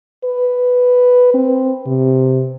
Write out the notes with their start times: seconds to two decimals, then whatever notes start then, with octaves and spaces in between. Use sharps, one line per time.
0.24 B4
1.34 C4
1.87 C3